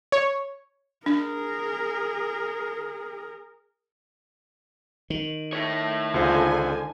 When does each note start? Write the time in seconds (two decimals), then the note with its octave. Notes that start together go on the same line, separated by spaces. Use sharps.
0.12 C#5
1.06 D4 G#4 A#4
5.10 D#3
5.53 E4 C#5
6.14 C#2 D3 F4 C5 G#5